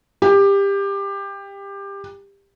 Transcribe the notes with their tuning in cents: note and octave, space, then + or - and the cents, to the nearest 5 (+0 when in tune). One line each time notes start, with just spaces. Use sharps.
G4 +20